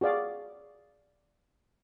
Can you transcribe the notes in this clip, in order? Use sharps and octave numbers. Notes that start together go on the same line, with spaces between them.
F#4 G#4 D5 F5 D6